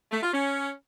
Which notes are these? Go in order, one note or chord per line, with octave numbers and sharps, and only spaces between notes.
A3
F4
C#4